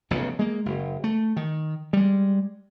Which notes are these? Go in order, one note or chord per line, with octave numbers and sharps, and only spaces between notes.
F1 B1 F2 C#3
G#3 A#3
F#1
A3
D#3
G3 G#3